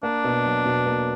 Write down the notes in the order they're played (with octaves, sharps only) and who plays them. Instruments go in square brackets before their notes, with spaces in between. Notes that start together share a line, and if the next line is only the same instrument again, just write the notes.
[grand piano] A#3 [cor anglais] D4
[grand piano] B2
F#3
B2
A#3